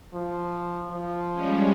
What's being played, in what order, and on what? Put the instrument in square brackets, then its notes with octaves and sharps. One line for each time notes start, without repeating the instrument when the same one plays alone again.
[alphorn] F3
F3
[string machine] G3 G#3 C#4